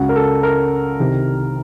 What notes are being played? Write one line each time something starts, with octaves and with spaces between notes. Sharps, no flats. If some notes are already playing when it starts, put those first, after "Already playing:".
Already playing: C#2 C#3 F#4
A#4
A4
A#4
C2 C3 D#3